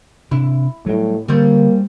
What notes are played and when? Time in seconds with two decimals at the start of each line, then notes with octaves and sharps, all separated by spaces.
0.31 C3 D4 E4
0.86 A2 F#3 G3
1.28 D3 G3 A#3 C4 C#4